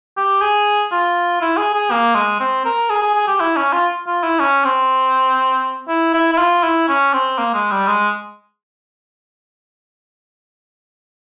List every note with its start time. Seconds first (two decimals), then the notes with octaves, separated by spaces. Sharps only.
0.17 G4
0.41 G#4
0.92 F4
1.41 E4
1.57 G#4
1.74 G#4
1.91 A#3
2.15 G#3
2.40 C4
2.65 A#4
2.90 G#4
3.02 G#4
3.15 G#4
3.27 G4
3.40 E4
3.56 C#4
3.73 F4
4.06 F4
4.23 E4
4.39 C#4
4.65 C4
5.88 E4
6.14 E4
6.33 E4
6.38 F4
6.63 E4
6.88 C#4
7.13 C4
7.38 A#3
7.54 G#3
7.71 G3
7.87 G#3